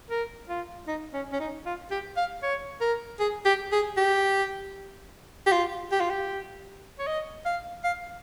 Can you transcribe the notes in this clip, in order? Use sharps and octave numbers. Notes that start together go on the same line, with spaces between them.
A#4
F4
D#4
C#4
C#4
D#4
F4
G4
F5
C#5
A#4
G#4
G4
G#4
G4
G4
F4
G4
F4
G4
C#5
D#5
F5
F5